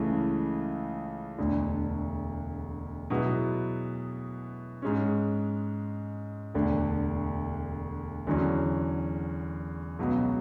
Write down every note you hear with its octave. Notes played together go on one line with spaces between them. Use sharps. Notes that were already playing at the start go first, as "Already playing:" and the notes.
Already playing: C#2 C#3 E3 A3
E1 D2 D3
B2 F#3 B3 E4 G#4
G#2 G#3 C#4
E1 D2 D3
E2 D3 F#3 C#4
C#2 B2 F#3 B3